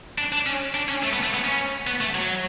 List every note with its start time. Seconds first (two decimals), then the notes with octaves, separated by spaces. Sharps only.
0.18 D4
0.32 D4
0.46 C#4
0.74 D4
0.89 C#4
1.03 A3
1.13 B3
1.23 A3
1.34 B3
1.45 C#4
1.87 B3
2.01 A3
2.15 F#3